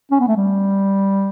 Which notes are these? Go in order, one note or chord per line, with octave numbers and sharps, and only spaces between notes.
C#4
B3
A3
G3